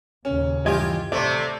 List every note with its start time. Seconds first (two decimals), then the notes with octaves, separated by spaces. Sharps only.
0.25 D#2 A#2 C#3 C#4
0.66 G2 E3 F4 G4 D#5 G#6
1.12 A1 C3 A3 D5